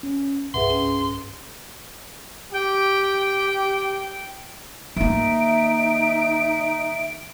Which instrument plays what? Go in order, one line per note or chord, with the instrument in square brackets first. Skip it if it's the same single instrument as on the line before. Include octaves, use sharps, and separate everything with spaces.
[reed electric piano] C#4
[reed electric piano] C2 G2 G#4 [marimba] B4 E5 F#5 [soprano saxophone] C6
[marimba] C#4
[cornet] G4 [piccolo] G5
[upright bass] D#3 A#3 [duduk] D#4 [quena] E5 [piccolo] D7